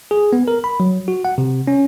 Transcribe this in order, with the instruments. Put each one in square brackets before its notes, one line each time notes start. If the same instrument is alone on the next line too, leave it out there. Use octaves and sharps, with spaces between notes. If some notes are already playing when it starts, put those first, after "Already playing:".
[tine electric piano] G#4
B3
A#4
B5
F#3
F#4
F#5
C3
C#4